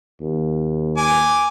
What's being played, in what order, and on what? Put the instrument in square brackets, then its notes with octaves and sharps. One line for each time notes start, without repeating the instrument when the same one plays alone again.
[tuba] D#2
[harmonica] G#5 D6